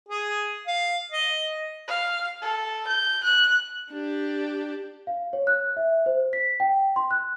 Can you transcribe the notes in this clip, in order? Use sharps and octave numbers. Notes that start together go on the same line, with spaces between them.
G#4
F5
D#5
F5
A4
G6
F#6
D4 G4
F5
C#5
F#6
E5
C5
B6
G5
C6
F#6